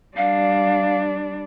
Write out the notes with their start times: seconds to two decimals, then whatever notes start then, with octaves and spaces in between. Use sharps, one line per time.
0.17 G3 D4 F5